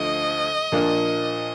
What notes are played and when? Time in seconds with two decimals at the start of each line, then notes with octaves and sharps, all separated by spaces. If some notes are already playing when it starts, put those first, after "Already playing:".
Already playing: D2 D3 F3 D#5
0.72 A#2 F3 A#3 D4